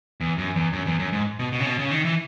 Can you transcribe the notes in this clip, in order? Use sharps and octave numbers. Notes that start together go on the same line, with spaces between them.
E2
F#2
E2
F#2
E2
F#2
G#2
B2
B2
C#3
B2
C#3
D#3
E3